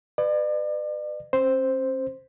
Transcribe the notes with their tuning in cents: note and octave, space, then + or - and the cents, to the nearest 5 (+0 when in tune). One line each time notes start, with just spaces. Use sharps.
B4 +20 D5 +40
C#4 -45 C5 +0